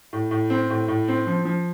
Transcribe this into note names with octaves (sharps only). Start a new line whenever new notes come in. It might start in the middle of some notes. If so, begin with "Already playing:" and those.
A2
A2
C4
A2
A2
C4
F3
F3